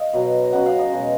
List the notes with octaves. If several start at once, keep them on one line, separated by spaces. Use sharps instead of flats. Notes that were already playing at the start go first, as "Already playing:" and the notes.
Already playing: D#5 F5
B2 F#3
C#3 F#3 F#5
F5
D#5
B2 G#3